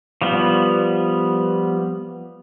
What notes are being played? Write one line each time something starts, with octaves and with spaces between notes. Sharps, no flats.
F3 G3 B3